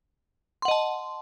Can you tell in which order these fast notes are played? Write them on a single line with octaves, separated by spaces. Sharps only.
C6 F#5 D#5 A5